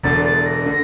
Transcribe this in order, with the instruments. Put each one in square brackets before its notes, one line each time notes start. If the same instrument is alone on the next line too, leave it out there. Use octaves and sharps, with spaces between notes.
[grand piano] E1 E2 D3 [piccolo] A6
[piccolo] A6
A#6
[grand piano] D3